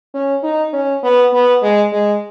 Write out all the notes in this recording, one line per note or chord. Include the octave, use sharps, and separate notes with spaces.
C#4
D#4
C#4
B3
B3
G#3
G#3